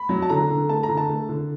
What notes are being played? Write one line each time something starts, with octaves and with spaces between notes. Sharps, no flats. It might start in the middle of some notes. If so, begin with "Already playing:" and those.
Already playing: B5
F#3
A5
D3 A#5
D3
A3 A5
A#5
D3
A5
A3
D3